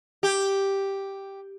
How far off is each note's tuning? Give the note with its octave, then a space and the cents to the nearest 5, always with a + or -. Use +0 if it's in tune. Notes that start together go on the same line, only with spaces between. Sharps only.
G4 +0